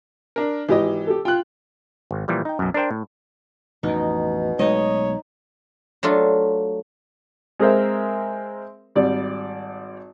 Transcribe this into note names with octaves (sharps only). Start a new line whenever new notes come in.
D4 A#4
G#1 E3 G4 D#5
G4 A4
F4 G5 F#6
G#1
A#2 E3 F3 G3
D#4 G5
B1 F#2
D4 A#4 C5 G5
A2
A1 F2 B2 D#4
B1 G#3 A3 D#4 C#5 D#5
F#3 A3 D4 F4
G#3 C4 G#4 A#4 C5 E5
G#1 G3 D5